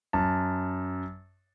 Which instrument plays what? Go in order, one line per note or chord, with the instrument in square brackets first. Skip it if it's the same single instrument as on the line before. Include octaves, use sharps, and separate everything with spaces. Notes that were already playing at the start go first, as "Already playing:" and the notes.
[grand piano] F#2 A5